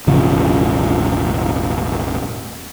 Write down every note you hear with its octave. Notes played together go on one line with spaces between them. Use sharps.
E1 A1 C#3 F3